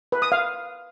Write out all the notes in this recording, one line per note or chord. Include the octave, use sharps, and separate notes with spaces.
B4
D#6
F5